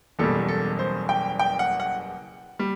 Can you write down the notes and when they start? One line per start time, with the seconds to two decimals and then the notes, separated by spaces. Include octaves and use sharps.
0.19 F#1 E2 B2 G3 A4
0.49 A4
0.79 C5
1.09 G5
1.39 G5
1.59 F#5
1.80 F#5
2.59 G3